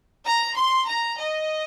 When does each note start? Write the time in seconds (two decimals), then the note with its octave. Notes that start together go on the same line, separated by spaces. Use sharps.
0.25 A#5
0.55 C6
0.86 A#5
1.19 D#5